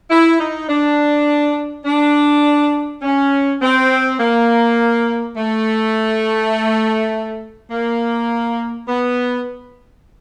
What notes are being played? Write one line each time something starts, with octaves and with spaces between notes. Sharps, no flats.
E4
D#4
D4
D4
C#4
C4
A#3
A3
A#3
B3